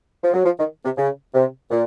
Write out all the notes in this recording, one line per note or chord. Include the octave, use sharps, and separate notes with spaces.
F3
F#3
F3
D#3
C3
C#3
C3
A#2